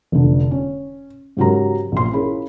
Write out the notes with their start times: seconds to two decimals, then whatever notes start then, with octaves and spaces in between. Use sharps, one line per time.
0.12 F1 D3
0.51 C#4
1.37 G#2 C#3 F#3 G4 A#4 A#5
1.92 A#1 C6
2.13 C#4 E4 F4 G#4 A#4 B5